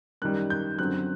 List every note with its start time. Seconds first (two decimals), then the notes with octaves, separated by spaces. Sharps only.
0.22 F#2 D#3 G3 F#6
0.50 G6
0.78 F#2 D3 F#3 C4 F#6